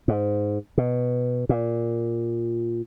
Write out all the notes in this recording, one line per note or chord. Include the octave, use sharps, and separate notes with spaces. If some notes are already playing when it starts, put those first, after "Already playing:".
G#2
B2
A#2